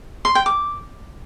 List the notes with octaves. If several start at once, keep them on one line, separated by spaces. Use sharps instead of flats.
C6
G5
D6